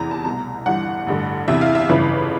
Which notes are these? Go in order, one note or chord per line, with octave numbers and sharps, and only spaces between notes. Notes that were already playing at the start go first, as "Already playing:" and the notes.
Already playing: F1 E2 C3 E3 A#5
A5
C2 B2 A#5
G1 G2 E3 F#5
A1 G2 D3
E2 C3 E3 E5
F5
E5
G1 F2 C#3 E3 B4